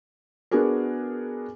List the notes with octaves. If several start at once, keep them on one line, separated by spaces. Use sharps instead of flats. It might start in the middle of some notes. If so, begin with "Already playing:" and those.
B3 D4 F#4 G#4 A#4